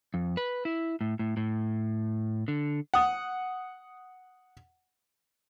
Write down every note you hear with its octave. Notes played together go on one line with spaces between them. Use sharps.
F2
B4
E4
A2
A2
A2
D3
F#5 D#6